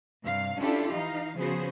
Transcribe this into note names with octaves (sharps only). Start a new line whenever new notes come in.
G2 C3 G3 F5
C#4 D4 E4 F4 G4 A4
E3 D#4 F5
C#3 F3 B3 F#4 G#4 C5